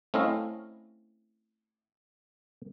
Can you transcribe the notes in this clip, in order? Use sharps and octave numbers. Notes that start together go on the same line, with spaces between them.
A3 C4 C#4 E4 D#5 F5